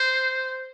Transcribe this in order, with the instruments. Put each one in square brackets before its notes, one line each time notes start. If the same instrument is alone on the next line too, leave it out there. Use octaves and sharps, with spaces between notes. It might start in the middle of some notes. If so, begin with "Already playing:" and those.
Already playing: [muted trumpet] C5